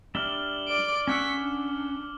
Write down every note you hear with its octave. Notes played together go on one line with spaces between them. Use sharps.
G3 D4 E5 F6 F#7 G7
D5 D7
C#4 F#5 C#6 D6 E6 B6
D4